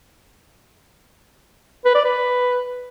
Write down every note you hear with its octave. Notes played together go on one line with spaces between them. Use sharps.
B4
D5
B4